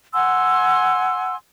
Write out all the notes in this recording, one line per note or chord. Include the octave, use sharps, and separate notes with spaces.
F#5 G#5 C6 E6